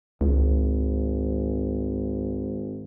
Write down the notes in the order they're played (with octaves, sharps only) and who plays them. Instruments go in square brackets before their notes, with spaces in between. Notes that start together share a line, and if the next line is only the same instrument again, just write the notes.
[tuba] G#1 [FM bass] C#2